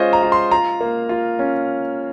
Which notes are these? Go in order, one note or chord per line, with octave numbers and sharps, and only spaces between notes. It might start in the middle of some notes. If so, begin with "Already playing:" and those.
Already playing: G#3 C#4 F4 C5 C#5 D#5
A#5
F4
C6
F4 A#5
A#3
F4
C#4